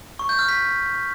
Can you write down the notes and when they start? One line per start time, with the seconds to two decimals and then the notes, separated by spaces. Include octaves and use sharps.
0.19 C#6
0.29 G6
0.39 F6
0.49 B6